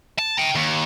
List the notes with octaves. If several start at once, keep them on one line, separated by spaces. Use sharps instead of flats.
A5
G5 A#5
D#2